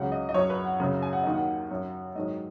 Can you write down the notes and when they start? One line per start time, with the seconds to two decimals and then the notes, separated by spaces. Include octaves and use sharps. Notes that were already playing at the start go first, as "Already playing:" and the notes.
Already playing: C#2 C#3 F#3 F#5
0.12 D#5
0.29 D#5
0.34 F#2 F#3 C#5
0.50 B4
0.65 F#5
0.80 F#2 C#3 F#3
1.02 G#5
1.13 F#5
1.23 D#2 D#3 F#3 D#5
1.34 F#5
1.71 F#2 F#3
2.15 G#2 D#3 F#3 D#5